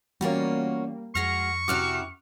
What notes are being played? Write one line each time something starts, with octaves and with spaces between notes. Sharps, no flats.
E3 G3 A#3 B3 C#4 F4 F#4
F2 G#3 F#4 C#6 F6 A#6 C7
C3 E4 F#4 D6 F6 F#6